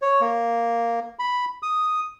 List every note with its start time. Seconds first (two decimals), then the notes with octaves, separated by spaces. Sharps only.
0.02 C#5
0.21 A#3
1.19 B5
1.63 D#6